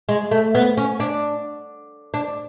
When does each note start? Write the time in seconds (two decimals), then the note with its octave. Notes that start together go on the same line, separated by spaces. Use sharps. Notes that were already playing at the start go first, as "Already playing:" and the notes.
0.09 G#3
0.31 A3
0.55 B3
0.77 C#4
1.00 D4
2.14 D4